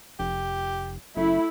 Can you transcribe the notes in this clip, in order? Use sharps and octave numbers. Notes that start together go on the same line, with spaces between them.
F1 G4
F#1 A3 E4